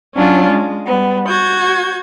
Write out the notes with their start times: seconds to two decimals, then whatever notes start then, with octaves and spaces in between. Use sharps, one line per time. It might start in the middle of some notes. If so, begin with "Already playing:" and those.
0.15 F#3 C#4 D4 F4
0.49 G#3
0.86 G3 B3
1.29 F#4 G6 G#6